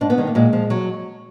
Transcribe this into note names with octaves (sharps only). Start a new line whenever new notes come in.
G#2 D4
B3
D#3 G#3
A#3
A#2 G#3
F3
F#3